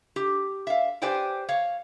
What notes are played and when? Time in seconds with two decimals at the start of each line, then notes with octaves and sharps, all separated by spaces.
0.16 G4
0.67 E5 F5
1.02 G4 B4 C5 D5 G5 G#5
1.49 C#5 F5